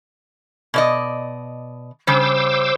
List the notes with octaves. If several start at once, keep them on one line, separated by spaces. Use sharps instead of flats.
B2 D5 D#5
C#3 G3 C5 D6 E6